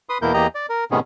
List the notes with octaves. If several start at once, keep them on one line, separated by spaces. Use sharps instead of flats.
B4 C6 D#6
E2 B2 A#3 E4 A#4 G6
E2 A#3 G4 D#5 A#5
D5
A#4
A2 C3 D#3 B3 C#4 G#4